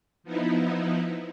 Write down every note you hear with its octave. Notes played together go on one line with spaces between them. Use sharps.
F3 B3 D#4 E4